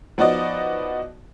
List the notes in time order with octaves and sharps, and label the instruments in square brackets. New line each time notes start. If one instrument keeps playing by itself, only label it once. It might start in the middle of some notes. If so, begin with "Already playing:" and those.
[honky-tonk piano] F3 B3 D#4 F#4 D5 D#5